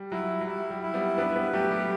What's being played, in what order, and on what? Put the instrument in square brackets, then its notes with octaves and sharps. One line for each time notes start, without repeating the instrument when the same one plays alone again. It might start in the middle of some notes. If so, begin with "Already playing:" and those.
Already playing: [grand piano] G3
[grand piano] F#3 [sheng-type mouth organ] E4
[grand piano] F#3
[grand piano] G3 [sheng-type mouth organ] E4
[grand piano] G3
[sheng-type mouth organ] E4
[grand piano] G3 B3
[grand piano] B3 D4 [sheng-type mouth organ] B4
[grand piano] G3 B3
[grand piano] F#3 A3 [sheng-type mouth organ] G4
[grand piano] G3